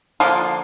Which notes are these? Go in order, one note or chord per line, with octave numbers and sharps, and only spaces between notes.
D3 F3 A#3 F4